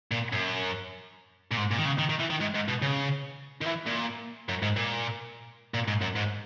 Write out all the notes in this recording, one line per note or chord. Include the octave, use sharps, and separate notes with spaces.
A#2
F#2
A#2
G#2
A#2
D#3
C#3
D#3
D#3
E3
D#3
G#2
G#2
B2
C#3
D#3
E3
A#2
F#2
G#2
A#2
A#2
G#2
F#2
G#2